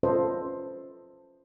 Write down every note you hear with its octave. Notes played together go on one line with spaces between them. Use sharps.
C#4 F4 A4 B4 C5 D#5